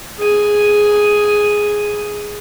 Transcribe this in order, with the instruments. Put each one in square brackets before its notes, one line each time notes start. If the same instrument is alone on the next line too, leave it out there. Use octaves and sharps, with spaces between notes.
[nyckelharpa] G#4 G#5